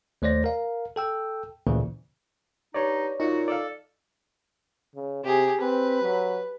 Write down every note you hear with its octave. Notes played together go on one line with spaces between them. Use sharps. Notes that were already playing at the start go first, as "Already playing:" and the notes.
D#2 A3 C5 D5 A#6
A#4 F5
A4 G5 E6
D2 A#2 C#3 E3 A#3
G2 D#4 C#5 D5
A#2 D#4 F4 F#4
A4 D5 F5
C#3
C3 G4 G#4
C4 B4
F#3